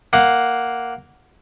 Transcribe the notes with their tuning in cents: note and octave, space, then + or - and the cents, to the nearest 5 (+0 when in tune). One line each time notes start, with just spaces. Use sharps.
A#3 +0 F#5 +0 C6 +0